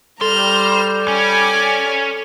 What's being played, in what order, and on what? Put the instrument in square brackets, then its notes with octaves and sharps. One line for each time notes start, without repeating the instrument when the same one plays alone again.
[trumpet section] G3 [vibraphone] A4 [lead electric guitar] C5 [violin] A#5 F6
[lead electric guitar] C#4 [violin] D5 G#5